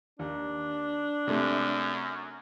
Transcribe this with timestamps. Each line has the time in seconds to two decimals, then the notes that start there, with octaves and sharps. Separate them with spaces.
0.19 D#2 D4
1.27 F#2 C3 A3